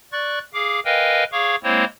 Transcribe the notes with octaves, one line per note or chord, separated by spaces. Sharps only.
D5 C#6 F#6 A6
G#4 F5 D6
A#4 B4 D#5 F5 G5 G#5
G#4 C#5 F5 C#6 D6
G#3 A#3 C4 E4 C5 C#5